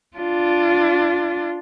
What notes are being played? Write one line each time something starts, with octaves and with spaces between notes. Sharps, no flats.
D4 F4